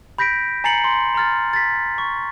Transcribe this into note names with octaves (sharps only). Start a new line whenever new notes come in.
B5 G6 A#6 B6 D7
G#5 A#5 A6 C7 C#7 F#7
C6
A#5 C6 F6 A6
A6 B6
C#6